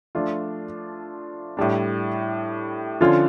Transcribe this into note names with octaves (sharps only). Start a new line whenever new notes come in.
F3 A3 D4 F4
A2 G3 D4
D3 F3 C#4 F4